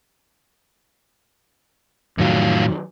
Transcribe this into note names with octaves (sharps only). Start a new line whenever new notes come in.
F2 A2 D#3 F#3 F4